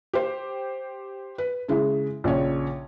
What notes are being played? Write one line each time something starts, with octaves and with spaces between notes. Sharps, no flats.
G4 C5
B4
C#3 G#3 E4
A#1 C#3 C#5